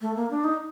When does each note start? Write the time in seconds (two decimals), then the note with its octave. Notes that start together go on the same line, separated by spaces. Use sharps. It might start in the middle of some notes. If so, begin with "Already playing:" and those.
0.01 A3
0.16 A#3
0.30 D4
0.44 D#4